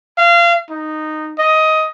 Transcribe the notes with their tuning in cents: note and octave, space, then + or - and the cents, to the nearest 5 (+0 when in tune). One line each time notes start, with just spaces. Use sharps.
F5 -25
D#4 -10
D#5 +15